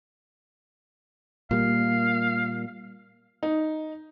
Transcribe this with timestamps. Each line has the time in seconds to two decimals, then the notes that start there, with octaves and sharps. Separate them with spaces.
1.51 A#2 G3 A#3 F5
3.43 D#4